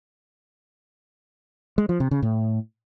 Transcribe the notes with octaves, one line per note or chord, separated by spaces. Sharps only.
G#3
F3
C3
C#3
A2